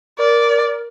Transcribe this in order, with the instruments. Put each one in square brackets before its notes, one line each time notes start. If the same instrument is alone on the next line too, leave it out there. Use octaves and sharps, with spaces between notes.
[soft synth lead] A#4 [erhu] D5